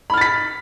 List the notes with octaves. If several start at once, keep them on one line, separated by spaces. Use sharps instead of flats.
B5 F6 A6 B6